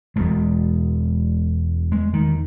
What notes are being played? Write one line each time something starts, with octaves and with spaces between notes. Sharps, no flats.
E1 E2 B2 G#3
G#3
D#3